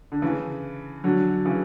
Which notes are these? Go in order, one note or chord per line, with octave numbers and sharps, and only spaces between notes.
D3
C#3 E3
D3 F#3
C#3 E3